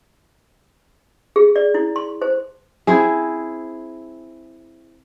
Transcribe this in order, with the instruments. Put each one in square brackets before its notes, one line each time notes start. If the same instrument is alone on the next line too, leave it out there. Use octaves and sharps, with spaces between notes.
[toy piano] G#4
D5
E4
C6
C5
[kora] C4 E4 G#4